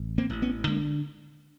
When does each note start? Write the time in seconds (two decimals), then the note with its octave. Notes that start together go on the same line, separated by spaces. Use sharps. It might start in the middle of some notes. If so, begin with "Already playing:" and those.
Already playing: A1
0.18 A#3 C4
0.30 A1
0.42 B3 C#4
0.67 D3 G#3 A#3